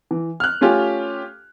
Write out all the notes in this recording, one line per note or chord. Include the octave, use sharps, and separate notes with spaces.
E3
F6 F#6
A3 C#4 F4 G4 G#5